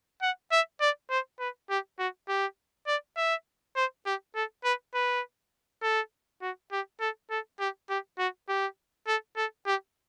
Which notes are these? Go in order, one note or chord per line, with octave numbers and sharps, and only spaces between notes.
F#5
E5
D5
C5
B4
G4
F#4
G4
D5
E5
C5
G4
A4
B4
B4
A4
F#4
G4
A4
A4
G4
G4
F#4
G4
A4
A4
G4